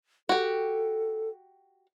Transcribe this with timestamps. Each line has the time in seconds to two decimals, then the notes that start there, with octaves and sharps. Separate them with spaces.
0.29 F#4 G4 A4